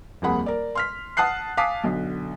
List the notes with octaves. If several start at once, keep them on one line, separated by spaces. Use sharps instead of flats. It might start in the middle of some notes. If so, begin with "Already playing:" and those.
D#1 F2 A#3 G#4 F#5 B5
A#4 D5
C6 F6 B6
F#5 A5 D#6 F#6 C7
F5 G#5 A5 D6 D#6 B6
B1 D3